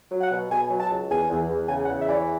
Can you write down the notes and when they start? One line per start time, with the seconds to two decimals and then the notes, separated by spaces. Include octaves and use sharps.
0.11 F#3
0.21 F#5
0.31 B2
0.51 B2 G#5
0.70 F#3
0.80 A5
0.90 C#2
1.10 E2 G#5
1.30 E2
1.50 E2
1.69 C#3 G#5
1.84 F#5
1.89 E2
1.98 E5
2.08 E3 D5
2.13 C#5